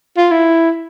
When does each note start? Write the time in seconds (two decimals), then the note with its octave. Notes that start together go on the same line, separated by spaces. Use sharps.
0.17 F4
0.31 E4